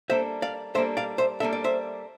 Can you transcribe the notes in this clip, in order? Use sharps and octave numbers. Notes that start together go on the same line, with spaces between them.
G3 A#3 D4 A4 C5 E5
D5 F5
G3 A#3 D4 A4 C5 E5
D5 F5
C5 E5
G3 A#3 D4 A4 E5
D5
C5 E5